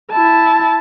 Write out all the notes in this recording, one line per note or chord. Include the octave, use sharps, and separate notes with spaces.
E4 A5